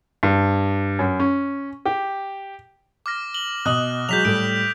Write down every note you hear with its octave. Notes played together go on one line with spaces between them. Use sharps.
G2
F#2
C#4
G4
D6 F6 A#6
F#7 G7
B2 D#5 D#6 F#6 F#7
F#3 G#3 F#4 G6 B6 F7
A2 G3 A4 D7